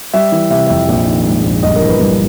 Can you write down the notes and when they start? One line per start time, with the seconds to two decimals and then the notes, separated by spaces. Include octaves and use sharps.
0.14 G3 E5
0.32 E3
0.50 C3 E5
0.67 F2 E5
0.88 A#1
1.07 D#3
1.26 G#2
1.44 A#1
1.63 G1 D#5
1.75 A#4
1.82 E3
1.88 B4
2.00 G2